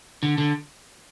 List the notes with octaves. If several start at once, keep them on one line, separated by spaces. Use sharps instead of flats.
D3
D3